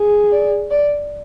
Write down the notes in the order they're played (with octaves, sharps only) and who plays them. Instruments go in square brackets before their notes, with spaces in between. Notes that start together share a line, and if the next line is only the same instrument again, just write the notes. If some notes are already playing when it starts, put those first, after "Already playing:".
Already playing: [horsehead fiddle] G#4
[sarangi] D5
D5